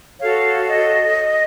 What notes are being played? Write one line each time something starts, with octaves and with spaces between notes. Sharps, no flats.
F#4 A4 C#5 F5
D#5